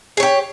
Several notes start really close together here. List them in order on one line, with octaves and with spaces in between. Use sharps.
G#4 C#5 G4